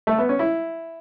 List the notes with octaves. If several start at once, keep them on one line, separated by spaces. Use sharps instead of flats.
A3
B3
C#4
E4